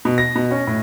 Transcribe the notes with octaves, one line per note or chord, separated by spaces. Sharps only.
B2
A#6
B2
C#4
A2